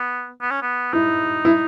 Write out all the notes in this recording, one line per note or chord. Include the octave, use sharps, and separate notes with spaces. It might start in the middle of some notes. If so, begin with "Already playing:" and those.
Already playing: B3
B3
C#4
B3
D#4 E4
E4